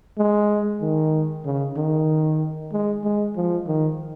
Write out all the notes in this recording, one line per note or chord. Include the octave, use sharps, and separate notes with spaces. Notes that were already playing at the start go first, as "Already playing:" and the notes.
G#3
D#3
C#3
D#3
G#3
G#3
F3
D#3